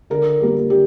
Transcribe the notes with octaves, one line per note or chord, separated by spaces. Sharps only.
D3 A#4
G3 A#3
D3 G4